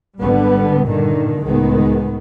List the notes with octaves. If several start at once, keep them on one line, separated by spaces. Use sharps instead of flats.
G#1 D3 G3 B3
G2 A#2 D3 D#3
C#2 A2 D#3 G#3 B3